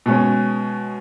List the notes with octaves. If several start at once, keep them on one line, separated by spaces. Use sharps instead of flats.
B2 G#3 C#4